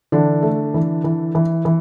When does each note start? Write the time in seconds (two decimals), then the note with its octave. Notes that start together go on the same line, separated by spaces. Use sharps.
0.12 D3 E3 D4
0.42 A3
0.74 E3
1.04 E3
1.35 E3
1.65 E3